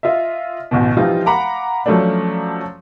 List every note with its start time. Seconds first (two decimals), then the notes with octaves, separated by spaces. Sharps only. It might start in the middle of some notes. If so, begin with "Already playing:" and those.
0.03 F4 D#5 E5
0.71 A1 D2 B2
0.97 E3 F3 G3 C4 D#4 F4
1.26 F5 F#5 A#5 B5 D6
1.86 F3 F#3 A3 C#4 D4